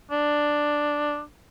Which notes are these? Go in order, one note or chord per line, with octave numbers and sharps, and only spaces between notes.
D4